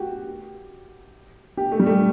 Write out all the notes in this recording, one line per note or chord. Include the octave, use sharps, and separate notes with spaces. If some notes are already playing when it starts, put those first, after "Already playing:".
Already playing: F#4 G4
G4
A3
G3
A3